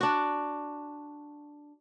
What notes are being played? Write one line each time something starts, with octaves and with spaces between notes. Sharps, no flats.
D4 F#4